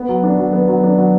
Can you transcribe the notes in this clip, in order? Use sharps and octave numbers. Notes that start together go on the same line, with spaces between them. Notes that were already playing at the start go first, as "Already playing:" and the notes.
Already playing: B3
F#3
D4
F#3
B3
F#3
D4
F#3